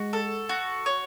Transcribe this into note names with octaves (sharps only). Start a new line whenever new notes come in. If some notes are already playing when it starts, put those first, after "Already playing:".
Already playing: G#3 F#4
A4
F#4
C#5